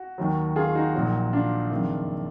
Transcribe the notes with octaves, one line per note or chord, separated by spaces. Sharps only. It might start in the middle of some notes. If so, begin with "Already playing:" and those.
Already playing: F#4
D#2 D#3 F#3
F4 G#4
D#4 F#4
A#1 A#2 F#3
D4 F4
F#1 F2 D#3